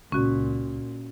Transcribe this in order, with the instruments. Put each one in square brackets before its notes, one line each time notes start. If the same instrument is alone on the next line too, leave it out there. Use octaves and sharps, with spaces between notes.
[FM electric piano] C#2 [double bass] A#2 [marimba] C#4 F#4